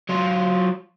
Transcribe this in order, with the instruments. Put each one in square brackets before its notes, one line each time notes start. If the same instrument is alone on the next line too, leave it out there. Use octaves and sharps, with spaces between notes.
[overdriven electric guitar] F#3 F4